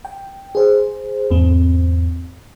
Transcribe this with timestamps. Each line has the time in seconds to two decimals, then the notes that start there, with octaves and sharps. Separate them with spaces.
0.05 G5
0.55 G#4 C5
1.30 E2 G#2 C4